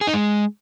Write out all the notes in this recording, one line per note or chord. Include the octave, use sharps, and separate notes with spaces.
G#4
D#4
G#3